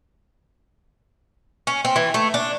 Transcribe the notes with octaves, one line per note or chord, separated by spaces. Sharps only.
C#4
C4
E3
A3
D4